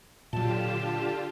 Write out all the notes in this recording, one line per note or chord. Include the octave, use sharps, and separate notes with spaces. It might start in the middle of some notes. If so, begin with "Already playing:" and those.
A#2 D3 F#3 F4 G4 A5